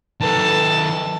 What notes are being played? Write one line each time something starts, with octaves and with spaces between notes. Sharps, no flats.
D#3 A4 B4 A5